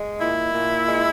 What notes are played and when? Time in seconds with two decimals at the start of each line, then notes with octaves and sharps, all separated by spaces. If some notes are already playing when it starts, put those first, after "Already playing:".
Already playing: G#3
0.20 A#2 E4
0.54 A#2
0.89 G#3